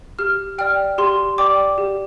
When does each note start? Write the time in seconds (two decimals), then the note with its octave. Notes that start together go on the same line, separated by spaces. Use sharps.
0.19 G4 F6
0.58 D5 G5 F6
0.98 G4 C6
1.38 D5 G5 D6
1.78 G4